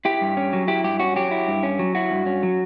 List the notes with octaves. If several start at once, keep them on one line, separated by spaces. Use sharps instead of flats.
E4 G4
G2
C#4
F#3
E4 G4
G2 G4
C#4 F#4
F#3 G4
E4
G2
C#4
F#3
E4 F#4
G2
C#4
F#3